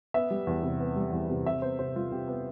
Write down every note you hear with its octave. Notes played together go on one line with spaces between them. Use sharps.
B3 E5
G3
E2
C3
B3
G3
E2
C3
C3 E5
B3 C5
C3 C5
G3 F4
C3 G4
B3